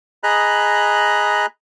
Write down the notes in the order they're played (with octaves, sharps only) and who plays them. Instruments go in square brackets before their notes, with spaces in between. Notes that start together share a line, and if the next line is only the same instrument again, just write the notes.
[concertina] G#4 D#5 A#5 B5 F#6